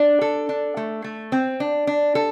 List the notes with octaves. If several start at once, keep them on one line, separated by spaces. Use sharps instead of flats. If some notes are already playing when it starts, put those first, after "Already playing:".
Already playing: D4
A4
D4
A3
A3
C4
D4
D4
A4